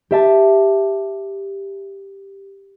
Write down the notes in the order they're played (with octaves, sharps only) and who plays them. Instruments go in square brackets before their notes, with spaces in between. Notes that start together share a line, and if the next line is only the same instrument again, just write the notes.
[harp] G4 E5 A5